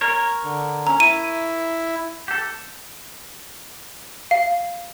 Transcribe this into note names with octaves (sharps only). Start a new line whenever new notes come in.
A#4 C#5
D3
C#4 A#5
E4 D#7
G4 A4
F5